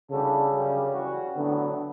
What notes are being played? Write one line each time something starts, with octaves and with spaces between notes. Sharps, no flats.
C#3 E3 G3 D4 F#4 A4
F#2 D3 G3
E3 G3 C#4 F#4
A2 D3 F#3 B3